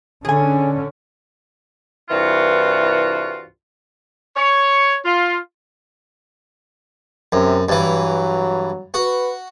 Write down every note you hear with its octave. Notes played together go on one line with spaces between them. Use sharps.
D3 C#4 G#4 G#5
C2 G2 E3 F4 F#4
C#5
F4
F#2 C3
G2 E3 F#3
F#4 B4